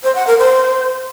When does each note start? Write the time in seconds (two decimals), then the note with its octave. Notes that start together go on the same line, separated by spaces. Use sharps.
0.03 C5
0.15 F#5
0.27 A#4
0.39 C5